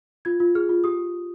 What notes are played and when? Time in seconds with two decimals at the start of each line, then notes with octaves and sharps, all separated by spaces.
0.25 F4 G#6
0.40 F4
0.55 G#4 F6
0.69 F4
0.84 G4 D#6